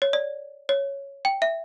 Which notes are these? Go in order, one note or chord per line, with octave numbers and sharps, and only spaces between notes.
C#5
D5
C#5
G5
E5